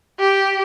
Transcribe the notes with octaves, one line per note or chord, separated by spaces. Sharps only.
G4